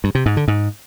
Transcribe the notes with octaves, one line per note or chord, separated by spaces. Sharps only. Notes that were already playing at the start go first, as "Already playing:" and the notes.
G2
C3
G#2
D3
G#2